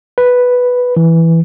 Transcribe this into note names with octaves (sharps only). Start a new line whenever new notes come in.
B4
E3